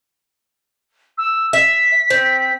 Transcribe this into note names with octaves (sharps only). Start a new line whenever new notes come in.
E6
E5 B6
C4